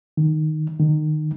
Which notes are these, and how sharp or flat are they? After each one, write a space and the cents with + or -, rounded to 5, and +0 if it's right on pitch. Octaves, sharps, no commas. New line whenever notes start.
D#3 -5
D#3 -25